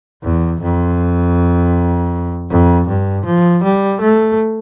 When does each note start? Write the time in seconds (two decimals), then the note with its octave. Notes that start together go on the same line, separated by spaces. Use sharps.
0.23 E2
0.61 F2
2.50 F2
2.88 G2
3.26 F3
3.64 G3
4.01 A3